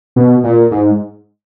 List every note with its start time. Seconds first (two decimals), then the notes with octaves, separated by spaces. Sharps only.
0.16 B2
0.44 A#2
0.71 G#2